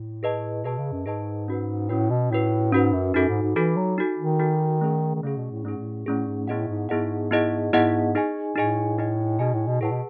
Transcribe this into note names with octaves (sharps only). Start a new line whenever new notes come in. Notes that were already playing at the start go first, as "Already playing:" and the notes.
Already playing: A2
G#4 B4 D#5 A5
B2 G#4 B4 D#5 A5
C#3
F#2
G#2 G#4 B4 D#5 A5
C#4 F#4 B4
A2 C#4 F#4 B4
B2
A2 C#4 F#4 B4
G#2 C#4 F#4 B4
F#2
F#2 D#4 F#4 A4
G#2
G#2
E3 D#4 F#4 A4
F#3
D#4 F#4 A4
D#3
D#4 F#4 A4
A3 C#4 G#4
D#3
C#3 A3 C#4 G#4
B2
A2
G#2 A3 C#4 G#4
A2
A2 A3 C#4 G#4
G#2
A2 B3 E4 G#4 D#5 F#5
G#2
G#2 B3 E4 G#4 D#5 F#5
B3 E4 G#4 D#5 F#5
G#2 B3 E4 G#4 D#5 F#5
D#4 G#4 D#5 G#5
A2 D#4 G#4 D#5 G#5
D#4 G#4 D#5 G#5
B2 D#4 G#4 D#5 G#5
A2
B2
A2 G#4 B4 F#5 A5
B2